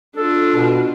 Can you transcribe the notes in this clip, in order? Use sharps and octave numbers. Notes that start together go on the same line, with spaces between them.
D4 F4 A4
B2